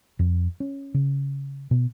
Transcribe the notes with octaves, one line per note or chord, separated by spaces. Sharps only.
F2
C#4
C#3
B2